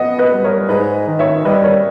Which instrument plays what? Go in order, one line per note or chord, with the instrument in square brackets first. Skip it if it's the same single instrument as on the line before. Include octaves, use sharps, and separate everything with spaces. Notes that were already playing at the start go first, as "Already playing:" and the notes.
Already playing: [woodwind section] B3 [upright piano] B4 D#5
[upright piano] B4 D#5
[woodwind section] G3
[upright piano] A#4 C#5
[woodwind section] G#2 [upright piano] B4 D#5
[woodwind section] D#3
[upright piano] C#5 E5
[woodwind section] G3 [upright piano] B4 D#5
[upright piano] A#4 C#5